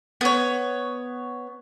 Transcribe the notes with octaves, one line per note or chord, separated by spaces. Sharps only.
B3 C#5